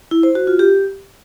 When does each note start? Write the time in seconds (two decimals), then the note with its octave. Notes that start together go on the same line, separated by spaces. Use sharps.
0.11 E4
0.23 C5
0.35 F#4
0.47 F4
0.59 G4